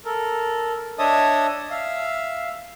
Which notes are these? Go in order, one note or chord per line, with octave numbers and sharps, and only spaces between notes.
A4 A#4
D4 C#5 D#5 E5 A5 D#6
E5 F5